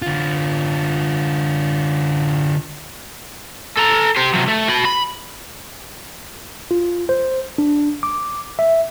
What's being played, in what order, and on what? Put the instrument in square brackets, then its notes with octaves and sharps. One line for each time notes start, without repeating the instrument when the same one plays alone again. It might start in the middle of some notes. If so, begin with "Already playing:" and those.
[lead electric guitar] D3 F4
[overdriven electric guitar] A4 A#5
G4 C5
C3 F#3
A3
F#4 B5
B5
[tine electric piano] F4
C5
D4
D6
E5